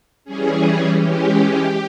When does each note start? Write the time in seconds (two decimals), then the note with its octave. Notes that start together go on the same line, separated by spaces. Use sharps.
0.25 E3 G3 C#4 G#4
0.94 E3 G#3 C#4 G4